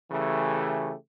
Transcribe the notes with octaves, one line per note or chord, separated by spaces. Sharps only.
C#3 E3 A3 G4